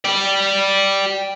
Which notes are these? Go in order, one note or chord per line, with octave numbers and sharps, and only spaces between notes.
G4 D5